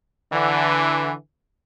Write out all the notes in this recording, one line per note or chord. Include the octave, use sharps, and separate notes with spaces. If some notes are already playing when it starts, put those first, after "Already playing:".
D3 E3